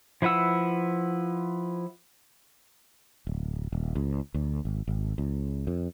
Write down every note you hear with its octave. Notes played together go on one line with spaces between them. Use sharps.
F3 E4 B4 F#5 E6
D1
D#1
C#2
D2
G#1
G#1
C#2
F2